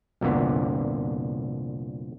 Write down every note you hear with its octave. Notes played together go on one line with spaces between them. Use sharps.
C2 F2 A#2 D3 B3